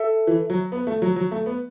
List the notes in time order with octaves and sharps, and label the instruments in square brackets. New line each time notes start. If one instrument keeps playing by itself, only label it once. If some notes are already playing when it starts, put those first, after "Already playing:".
Already playing: [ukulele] A4 E5
[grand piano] E3
F#3
B3
A3
F#3
F#3
A3
B3